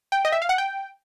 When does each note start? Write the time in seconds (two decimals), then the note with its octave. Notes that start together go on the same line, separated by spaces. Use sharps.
0.12 G5
0.25 D#5
0.32 E5
0.42 F5
0.49 F#5
0.58 G5